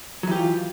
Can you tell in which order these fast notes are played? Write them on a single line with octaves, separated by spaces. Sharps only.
F#3 E3 G4 F4